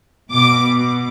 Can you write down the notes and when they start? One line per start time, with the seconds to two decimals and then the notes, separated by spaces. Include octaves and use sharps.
0.32 B2 D6